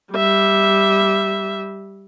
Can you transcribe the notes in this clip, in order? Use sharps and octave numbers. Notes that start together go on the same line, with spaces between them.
G3 E5